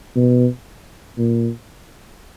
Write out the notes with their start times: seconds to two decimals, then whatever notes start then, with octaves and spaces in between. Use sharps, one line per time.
0.16 B2
1.18 A#2